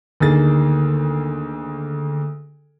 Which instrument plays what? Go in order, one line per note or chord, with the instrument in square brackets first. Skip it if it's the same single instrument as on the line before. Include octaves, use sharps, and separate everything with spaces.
[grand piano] D2 D#3 A#3 G#4 A6